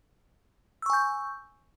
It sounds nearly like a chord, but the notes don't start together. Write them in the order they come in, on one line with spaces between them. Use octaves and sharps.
E6 C#6 G#5 G6